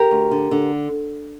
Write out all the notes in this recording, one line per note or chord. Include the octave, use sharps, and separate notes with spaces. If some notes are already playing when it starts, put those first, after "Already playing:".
Already playing: G4 A#4
D2
D3
D3